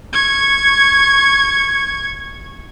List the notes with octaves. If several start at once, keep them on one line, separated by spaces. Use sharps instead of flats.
C#6 G#6